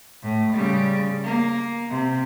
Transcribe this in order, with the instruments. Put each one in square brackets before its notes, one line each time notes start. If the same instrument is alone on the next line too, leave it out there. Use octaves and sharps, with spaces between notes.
[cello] A2
C#3 G3
A#3
C3